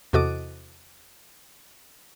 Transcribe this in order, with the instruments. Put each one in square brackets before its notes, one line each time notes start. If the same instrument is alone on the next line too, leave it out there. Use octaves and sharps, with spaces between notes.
[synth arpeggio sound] E2 C3 F#4 A4 D#5 D6